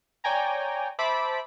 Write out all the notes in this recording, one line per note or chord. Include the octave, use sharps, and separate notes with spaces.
C#5 D5 G5 G#5 A#5
C5 E5 A5 B5 D6